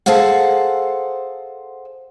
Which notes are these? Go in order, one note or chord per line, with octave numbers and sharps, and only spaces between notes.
G#4 A4 C5 F5 F#5